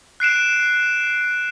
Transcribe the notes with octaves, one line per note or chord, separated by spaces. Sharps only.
F#6 C7 D7 E7